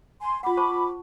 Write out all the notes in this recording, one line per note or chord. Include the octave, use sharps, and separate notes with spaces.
G#5 C6
F4 F#5 B5 D6
C5 A5 C#6